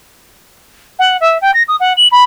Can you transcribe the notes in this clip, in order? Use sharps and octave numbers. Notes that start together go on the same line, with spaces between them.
F#5
E5
G5
A#6
D#6
F#5
F#7
B5